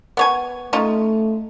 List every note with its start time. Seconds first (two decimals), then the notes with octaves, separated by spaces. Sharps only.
0.17 B3 C#5 G#5
0.73 A3 C#4 D#4 F4